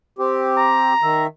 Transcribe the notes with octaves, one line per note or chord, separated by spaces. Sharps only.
C4 G4
A#5
D#3 E5